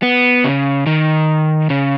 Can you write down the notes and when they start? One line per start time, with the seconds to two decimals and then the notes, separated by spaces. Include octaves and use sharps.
0.02 B3
0.44 C#3
0.87 D#3
1.70 C#3